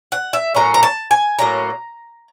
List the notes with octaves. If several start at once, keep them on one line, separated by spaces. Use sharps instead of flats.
F#5
E5
A2 F#3 A#3 C#4 A#5
A#5
A5
G#5
A2 F#3 A#3 C#4 A#5